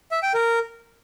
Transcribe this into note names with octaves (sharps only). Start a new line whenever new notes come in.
E5
G5
A#4